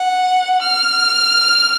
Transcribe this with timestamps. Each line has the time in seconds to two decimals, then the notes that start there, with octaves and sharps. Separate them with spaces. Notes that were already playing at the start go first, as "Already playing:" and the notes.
Already playing: F#5
0.62 F6